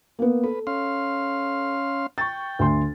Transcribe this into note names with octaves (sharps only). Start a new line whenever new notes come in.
A#3 B3
A4 B4
C#4 F5 C6
G5 C#6 A6
D2 C6